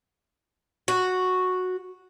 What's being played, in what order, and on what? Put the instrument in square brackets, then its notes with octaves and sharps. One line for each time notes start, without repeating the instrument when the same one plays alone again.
[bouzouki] F#4